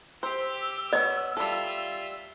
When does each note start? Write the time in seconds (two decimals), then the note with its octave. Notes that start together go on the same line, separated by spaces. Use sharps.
0.23 G4 C5 E6
0.93 B3 C#5 D#5
1.37 G3 F4 A4 E5